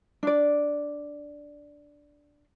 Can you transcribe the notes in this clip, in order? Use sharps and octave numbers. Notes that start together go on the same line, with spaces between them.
D4 D5